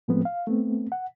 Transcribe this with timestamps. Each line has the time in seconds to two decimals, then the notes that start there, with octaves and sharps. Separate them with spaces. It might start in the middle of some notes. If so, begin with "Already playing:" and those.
0.08 A2 F3 G#3 A3 B3 C4
0.25 F5
0.47 A3 B3 C4
0.92 F#5